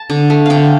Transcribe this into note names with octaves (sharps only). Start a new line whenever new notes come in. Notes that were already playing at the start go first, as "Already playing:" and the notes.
Already playing: A5
D3
A3
D3 F5 G5